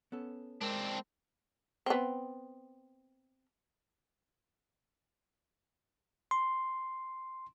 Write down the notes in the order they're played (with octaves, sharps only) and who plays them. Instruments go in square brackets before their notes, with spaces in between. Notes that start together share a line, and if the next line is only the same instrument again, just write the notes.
[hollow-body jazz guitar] B3 C#4 A4
[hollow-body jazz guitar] G#3 A#4 C5 [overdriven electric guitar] C4 D4
[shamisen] B3 C4
[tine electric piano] C6